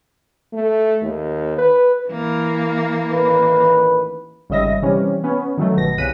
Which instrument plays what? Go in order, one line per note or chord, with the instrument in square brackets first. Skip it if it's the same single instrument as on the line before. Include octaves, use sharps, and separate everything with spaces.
[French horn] A3
D#2
B4
[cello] E3 A#3
[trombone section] A1 D#3 B4
[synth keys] G#1 C#3 G3 D#5 E5 A#6
C3 E3 G3 C#4
B3 C#4
D#3 F#3 A3
G1 B2 A#6
C2 C#3 F#6 B6 D#7